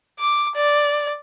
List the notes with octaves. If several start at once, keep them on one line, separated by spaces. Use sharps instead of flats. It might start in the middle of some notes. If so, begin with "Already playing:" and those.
D6
D5